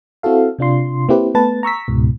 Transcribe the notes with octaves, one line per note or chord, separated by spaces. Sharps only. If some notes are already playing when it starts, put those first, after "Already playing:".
C4 E4 F#4 A4 F5
C3 D4 F4 C6
A#3 C4 E4 G4 B4 C5
A3 B3 B4 A5 A6
A#5 C#6 E6 B6
C#2 G#2 B2